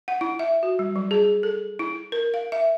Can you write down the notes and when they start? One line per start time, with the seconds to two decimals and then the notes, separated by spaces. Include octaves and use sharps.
0.08 F#5
0.21 E4
0.39 E5
0.63 F#4
0.79 G3
0.96 F#3
1.11 G#4
1.43 A4
1.79 E4
2.12 A#4
2.34 F5
2.52 E5